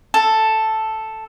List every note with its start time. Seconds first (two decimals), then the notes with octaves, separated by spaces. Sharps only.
0.14 A4